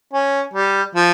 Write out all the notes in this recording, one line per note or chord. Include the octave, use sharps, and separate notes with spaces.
C#4
G3
F3